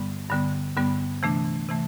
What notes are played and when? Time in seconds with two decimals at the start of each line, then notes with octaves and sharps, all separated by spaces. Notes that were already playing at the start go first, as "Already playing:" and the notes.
Already playing: G2 D3 G3 B3
0.30 G2 D3 G3 B3
0.77 G2 D3 G3 B3
1.23 C3 E3 A3 D4
1.69 C3 E3 A3